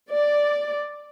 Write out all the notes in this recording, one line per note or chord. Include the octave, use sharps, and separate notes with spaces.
D5